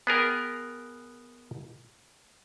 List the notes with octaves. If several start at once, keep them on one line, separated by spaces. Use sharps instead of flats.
B3 G#4 A#4 G5